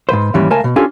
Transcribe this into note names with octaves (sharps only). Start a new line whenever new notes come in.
G#2 C#3 B4 C5
D#2 G#2 E3 G3 C#4
C#2 A3 A#4 F5 G#5 A5
B2
C#4 D4 F4 G4 A4 G#5